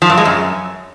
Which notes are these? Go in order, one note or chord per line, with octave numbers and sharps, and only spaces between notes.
F3
G2
G#3
F#2